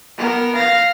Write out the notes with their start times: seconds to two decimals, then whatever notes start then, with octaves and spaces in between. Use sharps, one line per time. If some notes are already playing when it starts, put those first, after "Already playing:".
0.18 B3 A#4
0.55 F5 A#6